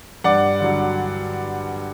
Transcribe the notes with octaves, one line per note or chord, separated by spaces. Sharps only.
G2 D5 F#5
D3 F#3